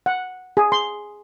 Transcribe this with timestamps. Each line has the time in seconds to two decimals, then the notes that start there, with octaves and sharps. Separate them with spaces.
0.06 F#5
0.57 G#4
0.72 C6